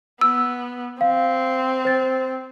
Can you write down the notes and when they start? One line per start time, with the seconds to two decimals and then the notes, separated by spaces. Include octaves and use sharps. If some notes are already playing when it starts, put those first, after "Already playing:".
0.21 B3 E6
1.01 C4 F5
1.85 C5 A6